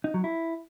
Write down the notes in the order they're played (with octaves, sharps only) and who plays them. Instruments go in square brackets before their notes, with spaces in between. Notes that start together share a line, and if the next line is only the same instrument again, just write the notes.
[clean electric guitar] D#4
F#3
E4